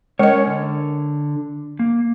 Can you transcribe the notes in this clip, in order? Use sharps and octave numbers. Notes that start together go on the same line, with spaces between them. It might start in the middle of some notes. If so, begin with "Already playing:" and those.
G#3 C#4 A#4 C#5 D#5
D3
A#3